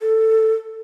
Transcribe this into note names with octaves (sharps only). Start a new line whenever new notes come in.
A4